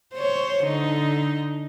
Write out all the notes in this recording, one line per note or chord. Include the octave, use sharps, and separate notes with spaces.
C5 C#5
D3 D#4